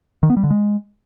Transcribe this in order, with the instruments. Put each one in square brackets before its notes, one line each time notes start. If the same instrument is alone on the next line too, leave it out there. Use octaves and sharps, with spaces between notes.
[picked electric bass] D#3
B3
G3
D3
G#3